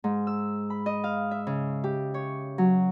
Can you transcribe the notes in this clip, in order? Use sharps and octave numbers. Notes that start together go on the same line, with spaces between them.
G#2
E6
B5
D#5
F5
E5
C#3
G4
C#5
F#3